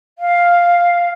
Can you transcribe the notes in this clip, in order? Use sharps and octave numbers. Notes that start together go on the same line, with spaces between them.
F5